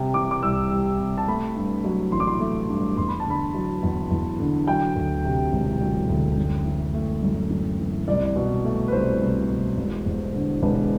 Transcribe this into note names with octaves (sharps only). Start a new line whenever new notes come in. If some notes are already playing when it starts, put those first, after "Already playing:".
Already playing: C3 G3
E3 D6
D6
C2 E6
G3
C3
A5
A3 B5
G2
F#3
A1 C6
D6
C6
A3
G2
E2 C6
B5
A5
D3 B5
F#3
E2
E2
D3
F#3 G5
D2
C3
E1
F#3
D2
F#2
E3
A3
F#2
F#2
E3
C2 D5
B2
A3
B4
C2 C5
C2
B2
E1
E2
D3
E1 B4